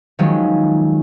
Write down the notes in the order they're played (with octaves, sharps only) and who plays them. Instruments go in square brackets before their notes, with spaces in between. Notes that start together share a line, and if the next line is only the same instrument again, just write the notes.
[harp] D#3 F3 F#3 G#3 C#4